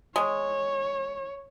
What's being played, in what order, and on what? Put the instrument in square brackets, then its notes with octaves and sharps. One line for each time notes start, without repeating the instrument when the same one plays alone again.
[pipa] G#3 [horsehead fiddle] C#5